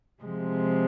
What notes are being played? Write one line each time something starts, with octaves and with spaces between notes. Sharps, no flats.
C3 F3 G#3